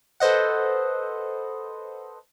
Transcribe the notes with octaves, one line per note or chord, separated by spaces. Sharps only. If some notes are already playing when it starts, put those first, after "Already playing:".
A4 B4 C5 D#5 F#5